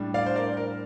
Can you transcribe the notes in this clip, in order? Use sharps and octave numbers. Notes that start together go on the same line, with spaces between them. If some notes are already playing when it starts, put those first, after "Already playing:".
Already playing: A2 G3 D4
D5 F5
C5
A#4 D5
A#4